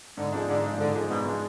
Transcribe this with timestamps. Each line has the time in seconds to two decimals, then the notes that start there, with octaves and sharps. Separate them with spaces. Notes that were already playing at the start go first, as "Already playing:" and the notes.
0.17 G#2 D3
0.32 F3 G#3 D4
0.48 G#2 D3
0.64 F3 G#3 D4
0.79 G#2 D3
0.95 F3 G#3 D4
1.10 G#2 B2
1.25 F3 G#3 D4